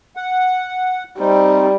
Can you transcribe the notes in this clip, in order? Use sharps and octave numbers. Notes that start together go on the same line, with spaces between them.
F#5
G3 C4 D#4